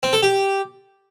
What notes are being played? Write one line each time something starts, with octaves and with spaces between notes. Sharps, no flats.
C4
A4
G4